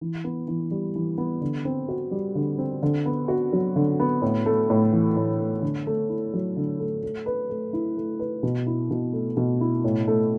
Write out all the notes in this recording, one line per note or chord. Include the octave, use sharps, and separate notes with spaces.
E3
B3
E3
G3
E3
B3
D3
C4
F#4
G3
D3
C4
D3
B3
F#4
F#3
D3
B3
A2
A3
A2
E3
A2
A3
D3
A3
E4
F#3
D3
A3
A3
B4
A3
E4
A3
B4
B2
E4
B2
A3
B2
E4
A2
A3